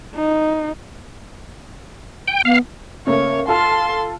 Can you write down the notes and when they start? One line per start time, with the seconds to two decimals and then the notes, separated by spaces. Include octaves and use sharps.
0.15 D#4
2.28 G5
2.45 B3 F5
3.07 C#3 A3 A#3 C#5
3.48 F4 A4 A5 C6 F6